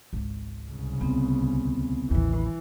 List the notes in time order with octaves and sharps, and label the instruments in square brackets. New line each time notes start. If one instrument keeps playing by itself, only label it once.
[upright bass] G#1 C#2
[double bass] C2 C#3
[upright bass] D2 [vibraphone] B3 C4
[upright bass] A1 D#2 [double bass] E3